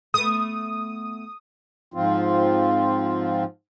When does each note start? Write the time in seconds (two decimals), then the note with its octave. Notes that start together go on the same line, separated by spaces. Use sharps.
0.14 A3 B3 D#6
1.94 G#2 F3 C4 F4